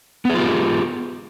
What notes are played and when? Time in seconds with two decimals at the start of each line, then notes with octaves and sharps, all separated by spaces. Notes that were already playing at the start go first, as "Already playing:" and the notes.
0.25 B3
0.30 G#4
0.34 F4
0.39 G4